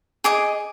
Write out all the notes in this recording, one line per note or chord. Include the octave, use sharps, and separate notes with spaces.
G#4 D#5 D6